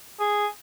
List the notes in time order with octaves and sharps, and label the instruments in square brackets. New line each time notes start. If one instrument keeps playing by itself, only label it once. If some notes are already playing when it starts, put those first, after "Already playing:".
[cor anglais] G#4